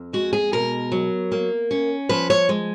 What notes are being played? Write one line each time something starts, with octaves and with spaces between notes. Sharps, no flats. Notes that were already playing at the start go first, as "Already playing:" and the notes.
Already playing: F2
G#3 F#4
G#4
B2 A#4
F#3
A#3
C#4
F3 B4
C#5
G#3